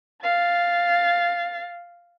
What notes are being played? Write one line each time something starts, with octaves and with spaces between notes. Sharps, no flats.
F5 A6